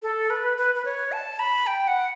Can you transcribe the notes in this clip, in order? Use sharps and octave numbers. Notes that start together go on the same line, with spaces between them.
A4
B4
B4
B4
C#5
A5
B5
G5
F#5